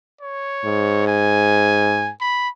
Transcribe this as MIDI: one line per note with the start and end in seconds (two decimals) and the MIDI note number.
0.21 1.06 73
0.65 2.10 44
1.07 2.12 80
2.21 2.49 83